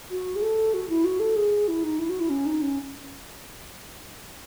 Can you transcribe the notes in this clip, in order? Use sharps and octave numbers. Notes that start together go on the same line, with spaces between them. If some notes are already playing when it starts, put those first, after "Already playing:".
F#4
G#4
A4
F#4
E4
F#4
A4
G#4
E4
D#4
E4
F#4
E4
C#4
D#4
C#4